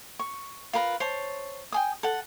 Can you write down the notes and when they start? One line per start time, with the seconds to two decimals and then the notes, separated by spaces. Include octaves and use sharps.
0.19 C#6
0.73 F4 A#4 B4 A#5
1.00 C5 C#5 A5
1.72 G5 G#5 D#6
2.03 A4 F#5